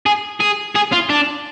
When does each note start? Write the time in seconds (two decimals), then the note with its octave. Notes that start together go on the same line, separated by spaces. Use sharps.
0.06 G#4
0.40 G#4
0.75 G#4
0.92 F4
1.09 D4